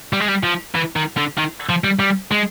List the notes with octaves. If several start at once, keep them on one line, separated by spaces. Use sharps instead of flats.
G3
G#3
G3
F3
E3
D#3
D3
D#3
F3
G3
G3
G#3